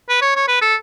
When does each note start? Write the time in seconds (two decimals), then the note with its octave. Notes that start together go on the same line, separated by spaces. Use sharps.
0.09 B4
0.21 C#5
0.36 C#5
0.48 B4
0.61 A4